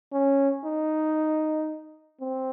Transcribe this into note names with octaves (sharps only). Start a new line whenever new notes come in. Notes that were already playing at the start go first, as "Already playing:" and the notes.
C#4
D#4
C4